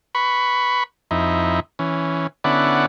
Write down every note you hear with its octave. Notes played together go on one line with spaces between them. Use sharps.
B4 B5 C#6
F2 D#4 E4
E3 C#4
D3 B3 C#4 E4 D5 F#5